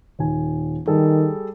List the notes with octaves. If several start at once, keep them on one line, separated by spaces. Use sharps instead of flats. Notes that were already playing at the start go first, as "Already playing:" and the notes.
D#1 D#3 G#5
D#3 G3 G#4 A4